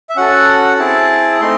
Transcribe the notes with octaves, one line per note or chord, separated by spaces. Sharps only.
E5
C#4 F#4 A4 F#5
C4 E4 G#4 A5
A3 C4 D#4 C6